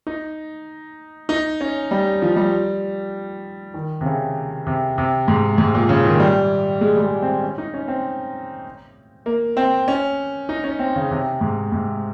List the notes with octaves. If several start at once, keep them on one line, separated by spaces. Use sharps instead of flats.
D#4
D#4
C#4
G3
F3
G3
D#3
C3
C#3
C3
C3
G#2
G#2
A#2
C#3
D#3
G3
G#3
G3
G#3
C4
C#4
D#4
C#4
C4
A#3
C4
C#4
D#4
C#4
C4
C#3
C3
G#2
G#2